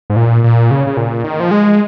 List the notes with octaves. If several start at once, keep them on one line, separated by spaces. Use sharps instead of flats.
G#2
A#2
A#2
C#3
C#3
A#2
D#3
F3
G#3